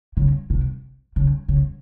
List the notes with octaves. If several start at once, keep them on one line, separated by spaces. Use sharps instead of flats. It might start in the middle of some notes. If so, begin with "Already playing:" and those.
C#3
C3
C#3
C#3